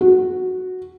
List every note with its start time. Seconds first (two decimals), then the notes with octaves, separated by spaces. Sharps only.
0.01 F#4